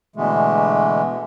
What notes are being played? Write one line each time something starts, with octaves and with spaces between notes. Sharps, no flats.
B2 D3 E3 G#3 A3